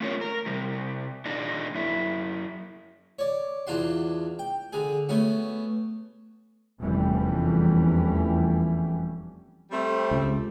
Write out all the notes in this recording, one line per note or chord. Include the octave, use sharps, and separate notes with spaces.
A3 C#4 F4 A#4 C#5
A#4
C3 G3
A#2 D4 D#4
F#2 E4
C#5 D5
E2 D4 F4 F#4 C6
G5
D3 G#4
A3 B3 C#4 F#4
F1 E2 E3 G3 A3 C#4
G3 A3 C4
C#2